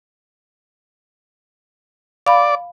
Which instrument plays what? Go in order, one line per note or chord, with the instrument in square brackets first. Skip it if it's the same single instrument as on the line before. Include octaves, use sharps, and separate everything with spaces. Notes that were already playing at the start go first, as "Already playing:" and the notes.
[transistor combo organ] D5 [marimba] F5 B5